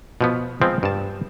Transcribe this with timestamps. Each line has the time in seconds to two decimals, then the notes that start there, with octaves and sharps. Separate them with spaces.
0.21 B2 F3 B3
0.62 F3 G#3 B3 C4
0.83 G2 A5